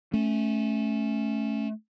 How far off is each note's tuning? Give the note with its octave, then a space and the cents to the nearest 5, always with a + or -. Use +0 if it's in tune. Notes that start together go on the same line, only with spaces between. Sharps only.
A3 -15 C#4 +0